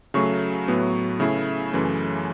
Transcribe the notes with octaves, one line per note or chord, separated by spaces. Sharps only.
C#3 F#3 A3 C#6
A2 F#3 B3
C#3 A3 E4
F#2 C#3 E3 A3